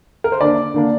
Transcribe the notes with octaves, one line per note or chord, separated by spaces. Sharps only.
A#4
C5
D3 A#3 D4 D5
D3 A#3 D4